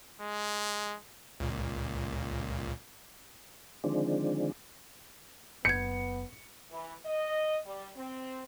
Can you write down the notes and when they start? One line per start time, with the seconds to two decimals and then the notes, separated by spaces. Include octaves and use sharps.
0.21 G#3
1.40 C#2 A#2
3.84 D3 D#3 F3 G#3 C4 D4
5.65 F#1 B3 G6 G#6 C#7
6.71 E3
7.05 D#5
7.66 G3
7.96 C4